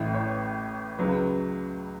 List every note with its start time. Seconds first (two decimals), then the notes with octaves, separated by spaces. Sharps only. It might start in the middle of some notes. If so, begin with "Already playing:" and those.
Already playing: A1 A2 E3 E5
0.14 C#5
0.99 C#2 C#3 F#3 B4